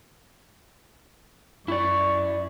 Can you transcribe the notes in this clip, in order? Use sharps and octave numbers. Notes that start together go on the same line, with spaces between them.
F#2 E4 D5 C#6